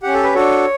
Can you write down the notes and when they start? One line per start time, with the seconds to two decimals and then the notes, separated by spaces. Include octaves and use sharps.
0.03 C#4 G4 F#5
0.14 A4
0.23 B4
0.35 D4 F#4 A4 C#5